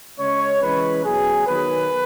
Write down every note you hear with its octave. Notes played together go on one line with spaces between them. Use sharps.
C#3 G#3 C#4 C#5
E3 G#3 C#4 B4
B2 F#3 B3 G#4
D#3 F#3 B3 B4